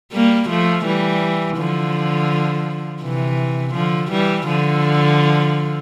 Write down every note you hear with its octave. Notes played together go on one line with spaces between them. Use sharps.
G3 A#3
F3 A3
E3 G3
D3 F3
C3 E3
D3 F3
E3 G3
D3 F3